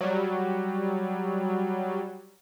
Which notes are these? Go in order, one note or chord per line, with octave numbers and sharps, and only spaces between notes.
F#3 G3